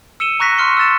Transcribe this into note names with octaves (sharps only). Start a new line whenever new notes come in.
E6 C#7 D#7 E7 G7
A#5 C#6 F#6 A#6 B6
C6 C#6 F6 C#7 G7
E6 F6 A6 E7